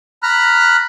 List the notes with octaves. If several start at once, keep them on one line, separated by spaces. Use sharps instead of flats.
A#5 B5 F6 F#6